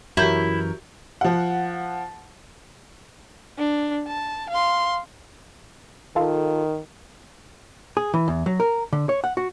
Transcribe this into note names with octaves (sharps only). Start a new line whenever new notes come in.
F#2 E3 E4 F#4 G4 A#4 C#5 G6
F3 F#5
D4
A5
F5 C6
D#3 F4 A4
G#4
E3
E2
F#3
A#4
D3
C#5
F#5
F#4